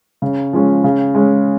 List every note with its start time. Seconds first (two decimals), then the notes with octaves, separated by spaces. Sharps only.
0.22 C#3
0.53 F3 G#3 C#4
0.84 C#3
1.15 G#3 C#4